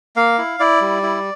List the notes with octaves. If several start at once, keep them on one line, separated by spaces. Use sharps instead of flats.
A#3 F5
E4
E4 D5
G3
E4